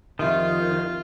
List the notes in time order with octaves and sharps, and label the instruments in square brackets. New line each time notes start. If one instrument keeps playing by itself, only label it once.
[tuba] F2 [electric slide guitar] D#3 [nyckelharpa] F4 [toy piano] G4 E5 F#5